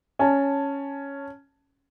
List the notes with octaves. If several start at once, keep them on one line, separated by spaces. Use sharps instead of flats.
C#4 A5